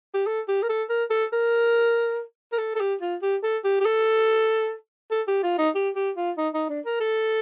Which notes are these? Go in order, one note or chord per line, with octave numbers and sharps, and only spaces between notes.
G4
A4
G4
A#4
A4
A#4
A4
A#4
A#4
A4
A4
G4
F4
G4
A4
G4
G4
A4
A4
G4
F4
D#4
G4
G4
F4
D#4
D#4
D4
A#4
A4